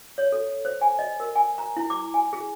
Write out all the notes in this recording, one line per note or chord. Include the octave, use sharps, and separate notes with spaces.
C#5
A4
C5
G#5
D#5
A#4
G#5
A#5
E4
D6
G#5
G#4